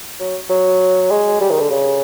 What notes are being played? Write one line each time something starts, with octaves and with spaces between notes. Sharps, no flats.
F#3
F#3
G#3
G3
D#3
D3
C#3